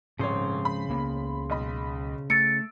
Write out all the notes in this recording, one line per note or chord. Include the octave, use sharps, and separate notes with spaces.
D#1 G#2 C#3 F3 C4 C5 C#5
B5
C#2 A#3 B3
B1 D#5 B5
A3 E6 A6 C#7 D7